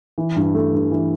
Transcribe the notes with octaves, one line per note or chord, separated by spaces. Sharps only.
E3
G2
A3
G2
E3